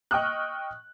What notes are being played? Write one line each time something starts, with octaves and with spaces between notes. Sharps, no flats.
D#5 G5 C#6 D#6 F6 F#6